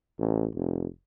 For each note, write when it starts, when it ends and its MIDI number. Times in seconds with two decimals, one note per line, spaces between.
0.19 0.48 33
0.55 0.86 29